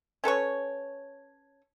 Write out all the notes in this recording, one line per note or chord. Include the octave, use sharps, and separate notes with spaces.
C#4 A4 B4 C#5